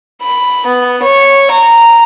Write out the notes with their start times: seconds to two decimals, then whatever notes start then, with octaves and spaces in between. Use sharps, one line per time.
0.22 B5
0.66 B3
1.03 C#5
1.51 A#5